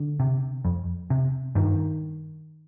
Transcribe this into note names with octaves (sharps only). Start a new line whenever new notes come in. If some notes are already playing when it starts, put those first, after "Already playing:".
Already playing: D3
C3
F2
C3
G2 D#3